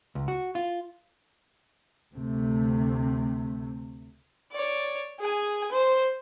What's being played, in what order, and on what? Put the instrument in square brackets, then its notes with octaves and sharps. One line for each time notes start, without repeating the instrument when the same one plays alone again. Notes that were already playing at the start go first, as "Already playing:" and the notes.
[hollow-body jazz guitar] C#2
F#4
F4
[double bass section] D2 C3 A3
[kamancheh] C#5 D5
G#4 G#5
C5